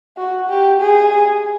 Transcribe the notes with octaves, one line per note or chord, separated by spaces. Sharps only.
F#4
G4
G#4